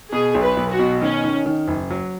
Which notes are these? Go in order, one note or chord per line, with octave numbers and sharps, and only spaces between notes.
B2 G#4
B1
B4
B1
F#4
B2
D#3 C#4
D#3
D#3
F#1
F#3